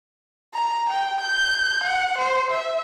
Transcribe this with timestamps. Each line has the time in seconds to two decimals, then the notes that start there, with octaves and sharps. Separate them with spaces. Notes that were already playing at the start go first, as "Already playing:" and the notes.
0.54 A#5
0.89 G5
1.21 G6
1.84 F#5
2.18 C5
2.50 E5